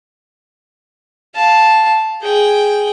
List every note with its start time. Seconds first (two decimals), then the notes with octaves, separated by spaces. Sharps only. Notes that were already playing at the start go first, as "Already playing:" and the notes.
1.36 F5 A5
2.22 G#4 G5